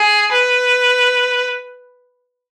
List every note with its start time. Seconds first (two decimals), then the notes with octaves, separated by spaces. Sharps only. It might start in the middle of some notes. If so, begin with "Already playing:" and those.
Already playing: G#4
0.31 B4